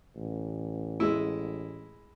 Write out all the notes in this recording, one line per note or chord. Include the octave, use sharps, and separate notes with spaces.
A1
G#3 E4